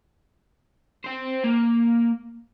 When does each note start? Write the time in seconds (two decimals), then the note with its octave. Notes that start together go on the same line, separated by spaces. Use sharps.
1.04 C5 G5
1.44 A#3